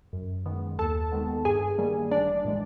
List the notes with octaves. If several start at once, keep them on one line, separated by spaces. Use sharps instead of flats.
F#2
D#3 G#3 B3
D#2 A4 A5
D#3 G#3 B3
G2 G#4 G#5
D#3 G3 A#3
A1 D4 D5
A2 E3 G#3